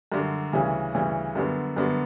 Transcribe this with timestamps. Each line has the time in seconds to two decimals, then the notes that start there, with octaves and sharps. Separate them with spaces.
0.12 F#2 D3 G3
0.53 D2 C#3 E3 G3
0.95 D2 C#3 E3 G3
1.35 F#2 D3 G3 B3
1.76 F#2 D3 G3 B3